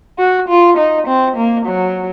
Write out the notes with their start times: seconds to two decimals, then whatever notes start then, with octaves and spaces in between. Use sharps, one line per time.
0.19 F#4
0.49 F4
0.78 D#4
1.07 C4
1.36 A#3
1.66 F#3